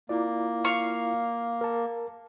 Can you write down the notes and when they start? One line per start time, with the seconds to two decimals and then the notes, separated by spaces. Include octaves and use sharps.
0.09 A#3 E4 F4 D5
0.65 F5 C#6
1.61 A#4 A5